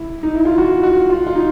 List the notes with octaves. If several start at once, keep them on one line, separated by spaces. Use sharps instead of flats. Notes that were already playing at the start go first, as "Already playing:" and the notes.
Already playing: E4
D#4
E4
F4
F#4
F#4
F4
F4
D#4